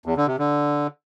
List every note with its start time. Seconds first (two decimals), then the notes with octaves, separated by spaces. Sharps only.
0.06 E2
0.17 D3
0.27 C3
0.38 D3